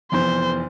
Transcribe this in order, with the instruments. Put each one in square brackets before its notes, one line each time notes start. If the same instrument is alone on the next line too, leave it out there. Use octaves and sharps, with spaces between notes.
[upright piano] F1 F2 E3 B3 [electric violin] C5